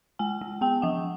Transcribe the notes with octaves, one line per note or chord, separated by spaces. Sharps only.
G#3 G#5
G#3
B3 G5
F3 F#5